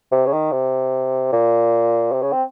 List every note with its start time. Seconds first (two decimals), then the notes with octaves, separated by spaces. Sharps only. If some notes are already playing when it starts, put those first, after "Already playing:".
0.12 C3
0.26 C#3
0.33 D#3
0.52 C3
1.32 A#2
2.12 C3
2.22 C#3
2.32 C4